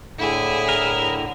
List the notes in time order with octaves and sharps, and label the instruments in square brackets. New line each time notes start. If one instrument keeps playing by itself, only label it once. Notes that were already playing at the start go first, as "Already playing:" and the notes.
[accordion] A2 D3 [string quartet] E4 G#4
[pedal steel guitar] A#4